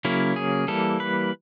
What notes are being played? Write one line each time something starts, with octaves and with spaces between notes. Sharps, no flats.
C#3 F#3 A#3 C#4 E4
G#4
E3 G3 A#3 A4
B4